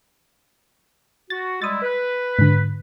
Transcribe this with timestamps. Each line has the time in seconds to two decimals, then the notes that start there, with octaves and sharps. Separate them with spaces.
1.30 F#4 A6
1.62 G3 G#3 E4 D#6 A6
1.82 B4
2.39 G#2 D3